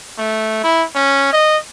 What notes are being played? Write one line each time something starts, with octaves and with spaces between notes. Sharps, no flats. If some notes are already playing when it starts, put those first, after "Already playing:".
A3
E4
C#4
D#5